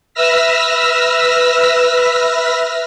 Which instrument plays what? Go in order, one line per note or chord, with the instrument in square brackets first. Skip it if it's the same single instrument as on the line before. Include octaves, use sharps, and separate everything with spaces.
[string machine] B4 E5 E6 F6 A#6 B6